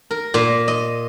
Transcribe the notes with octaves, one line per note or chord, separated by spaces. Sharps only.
A#4
A#2
D#5